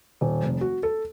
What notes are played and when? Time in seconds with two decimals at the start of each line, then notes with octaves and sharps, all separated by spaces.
0.21 D#1
0.43 F1
0.61 F#4
0.83 A4